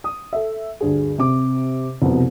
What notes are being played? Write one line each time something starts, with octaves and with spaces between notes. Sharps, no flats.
D#6
A4 E5
D2 G2 G#4
C3 D6
C2 F2 B2 B3